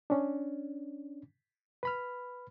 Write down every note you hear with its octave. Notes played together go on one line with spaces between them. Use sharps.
C#4 D4
B4 B5 F6